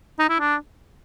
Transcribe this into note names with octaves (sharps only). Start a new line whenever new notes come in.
D#4
E4
D4